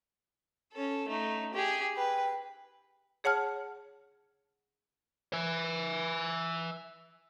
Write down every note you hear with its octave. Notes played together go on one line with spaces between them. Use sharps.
C#4 A4
A3 D#4
G4 G#4
B4 G5
G#4 C#5 F#5 A5 F6
E5 G#5